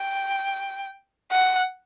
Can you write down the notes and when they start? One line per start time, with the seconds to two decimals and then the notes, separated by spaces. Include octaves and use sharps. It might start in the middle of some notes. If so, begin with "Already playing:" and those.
Already playing: G5
1.31 F#5